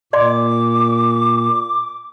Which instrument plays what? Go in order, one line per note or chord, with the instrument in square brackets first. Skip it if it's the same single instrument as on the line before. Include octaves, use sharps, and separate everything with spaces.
[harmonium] A#2 [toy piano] D5 D#5 C6 [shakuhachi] D6